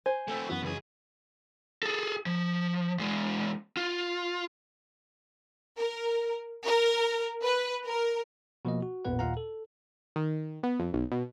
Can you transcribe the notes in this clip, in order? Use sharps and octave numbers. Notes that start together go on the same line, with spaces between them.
C5 G#5
A3 C4
F#2 E3 B3 F#4
C#2 G#4
G#4 A4
F3
E2 G#3
F4
A#4
A#4
B4
A#4
B2 F3 A#3 D#5
F#4
A1 E2 A#2 B3 B4 F#5
D#2 A#2 F5 F#5 A#5
A4
D#3
B3
F2
B1
B2